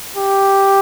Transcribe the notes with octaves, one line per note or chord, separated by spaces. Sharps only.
G4